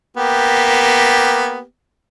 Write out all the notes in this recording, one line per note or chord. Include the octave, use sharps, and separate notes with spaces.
A#3 B3 G4